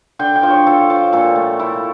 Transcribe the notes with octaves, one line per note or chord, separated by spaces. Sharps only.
D3 G5
G5
F3
C#5
F3 A4
F3
A#2 A4
A3
A3 E4